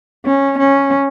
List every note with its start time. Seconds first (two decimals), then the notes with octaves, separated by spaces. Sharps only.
0.25 C#4
0.59 C#4